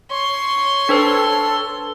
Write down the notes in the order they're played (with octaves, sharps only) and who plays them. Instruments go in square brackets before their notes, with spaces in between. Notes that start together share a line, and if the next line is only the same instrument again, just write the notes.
[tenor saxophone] C#5 [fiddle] C6
[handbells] D4 B4 C5 [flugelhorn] A4